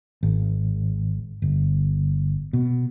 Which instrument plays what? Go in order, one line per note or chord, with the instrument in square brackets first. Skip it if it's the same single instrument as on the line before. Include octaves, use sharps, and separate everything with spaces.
[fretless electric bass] G#1
G1
B2